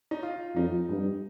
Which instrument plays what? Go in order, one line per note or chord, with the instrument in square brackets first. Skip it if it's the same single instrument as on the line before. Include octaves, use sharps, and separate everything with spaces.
[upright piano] D#4
F4
[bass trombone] F2 [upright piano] D#4
[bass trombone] G2